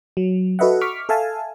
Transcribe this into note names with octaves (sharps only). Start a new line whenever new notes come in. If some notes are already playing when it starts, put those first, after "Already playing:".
F#3
F#4 A4 B4 D#5 E5 F#5
C#6 D6 F6 B6
A4 E5 F5 G#5 A5